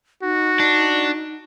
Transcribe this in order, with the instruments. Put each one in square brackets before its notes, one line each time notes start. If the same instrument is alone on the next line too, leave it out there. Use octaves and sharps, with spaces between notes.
[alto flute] D#4 [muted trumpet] F#4
[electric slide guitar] D4